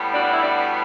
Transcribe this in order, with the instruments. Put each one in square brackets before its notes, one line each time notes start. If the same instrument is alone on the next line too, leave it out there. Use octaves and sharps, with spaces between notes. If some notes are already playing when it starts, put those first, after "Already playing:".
Already playing: [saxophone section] A2 G3 B3
D4 F#4
D4
E4
D4 F#4